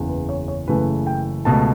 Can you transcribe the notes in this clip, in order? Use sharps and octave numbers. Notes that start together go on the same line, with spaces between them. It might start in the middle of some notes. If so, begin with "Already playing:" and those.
Already playing: F#1 E2 C#3
B4
C#5
C#5
F#1 F#2 C#3 E3 A3 B4
G5
C#2 B2 A3 A5